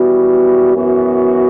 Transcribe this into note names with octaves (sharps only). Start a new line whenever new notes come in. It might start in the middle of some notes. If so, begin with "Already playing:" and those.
Already playing: E3 G3 B3 F#4
F#2 E3 B3 F#4